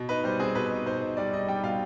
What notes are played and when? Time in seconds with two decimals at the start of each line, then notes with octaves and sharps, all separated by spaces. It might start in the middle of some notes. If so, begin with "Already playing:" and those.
Already playing: B2
0.09 D#4 B4
0.24 G3 C5
0.39 C4 G#4
0.55 B2 B4
0.71 D#4
0.86 D#4 C5
1.02 D#4
1.17 G3 D5
1.33 D#4 D#5
1.48 G3 G5
1.63 B2 F5